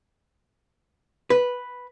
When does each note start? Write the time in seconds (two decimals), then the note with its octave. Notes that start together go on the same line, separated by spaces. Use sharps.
1.30 B4